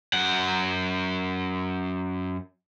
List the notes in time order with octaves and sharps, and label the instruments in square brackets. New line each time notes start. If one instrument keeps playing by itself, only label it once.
[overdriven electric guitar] F#2 F#5